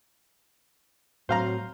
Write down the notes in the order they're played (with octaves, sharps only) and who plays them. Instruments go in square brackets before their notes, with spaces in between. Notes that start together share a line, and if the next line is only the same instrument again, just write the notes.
[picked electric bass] A2 [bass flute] F#3 [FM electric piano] C4 F#4 [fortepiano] C5 F5 A#5